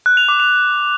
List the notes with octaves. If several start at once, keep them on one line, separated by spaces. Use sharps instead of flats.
F#6
F7
D6
F7